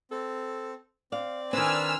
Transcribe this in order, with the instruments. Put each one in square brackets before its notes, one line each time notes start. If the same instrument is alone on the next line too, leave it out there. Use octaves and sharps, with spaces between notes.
[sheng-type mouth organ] C4 [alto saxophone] A4
[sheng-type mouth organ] C4 [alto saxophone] D5 [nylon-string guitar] F5
[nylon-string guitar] D#3 C4 [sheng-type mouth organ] D4 B4 [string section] G#5 E6 F6